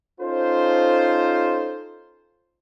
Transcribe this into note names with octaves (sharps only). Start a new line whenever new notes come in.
C#4 D#4 F4 A4 C5